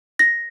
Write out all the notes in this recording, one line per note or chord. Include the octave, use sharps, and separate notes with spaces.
A#6